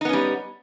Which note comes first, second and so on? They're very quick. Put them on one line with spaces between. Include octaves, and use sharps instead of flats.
D#4 B3 C#4 G3